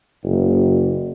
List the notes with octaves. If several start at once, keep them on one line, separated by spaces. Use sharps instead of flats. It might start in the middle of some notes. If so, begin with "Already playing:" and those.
F#1